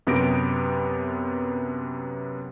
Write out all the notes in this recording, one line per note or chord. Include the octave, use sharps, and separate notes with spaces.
F#2 C3 B3 G4 A#6 D7